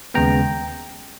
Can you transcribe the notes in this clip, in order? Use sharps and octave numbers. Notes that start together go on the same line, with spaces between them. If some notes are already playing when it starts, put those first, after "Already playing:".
D#2 C#3 G#3 B3 G5 A#5